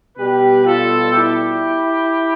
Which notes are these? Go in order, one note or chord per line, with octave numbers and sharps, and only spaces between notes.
B2 G3 G4 B4
F4 A4
E4 G4